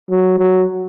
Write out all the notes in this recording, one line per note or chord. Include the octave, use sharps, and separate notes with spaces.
F#3
F#3